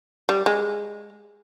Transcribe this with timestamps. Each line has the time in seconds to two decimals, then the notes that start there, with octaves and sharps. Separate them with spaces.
0.29 G3
0.46 G#3